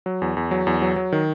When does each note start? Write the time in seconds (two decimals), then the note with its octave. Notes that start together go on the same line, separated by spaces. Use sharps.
0.06 F#3
0.22 E2
0.37 E2
0.51 F#3
0.67 E2
0.82 F#3
0.96 F#3
1.12 D#3